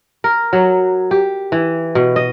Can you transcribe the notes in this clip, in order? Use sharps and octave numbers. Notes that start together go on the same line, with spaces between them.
A#4
F#3
G4
E3
B2
D#5